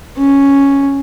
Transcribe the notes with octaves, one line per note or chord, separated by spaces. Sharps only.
C#4